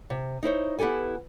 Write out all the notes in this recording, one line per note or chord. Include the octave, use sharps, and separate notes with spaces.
C3
D#4 E4 C5 C#5
B3 E4 G4 A4 G#5